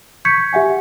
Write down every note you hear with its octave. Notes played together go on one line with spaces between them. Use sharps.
C#6 G6 G#6 B6 C#7
G4 E5 F#5 G#5